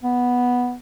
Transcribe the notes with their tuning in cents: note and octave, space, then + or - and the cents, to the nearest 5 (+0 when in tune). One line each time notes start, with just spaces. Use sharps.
B3 -5